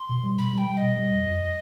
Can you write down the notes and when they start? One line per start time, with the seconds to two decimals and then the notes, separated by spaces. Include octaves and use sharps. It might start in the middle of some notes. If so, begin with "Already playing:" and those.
Already playing: C6
0.09 B2
0.23 G3
0.38 B2 B5
0.53 G3
0.58 G5
0.67 G3
0.77 B2 D#5
0.96 G3
1.11 F2
1.26 F2